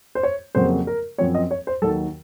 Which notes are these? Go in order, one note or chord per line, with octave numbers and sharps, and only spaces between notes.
C5
C#5
F2 C#3 F#3 A#3 C5
A#4
F#2 F3 C4 C#5
D#5
C#5
C5
D#2 D#3 F#3 A4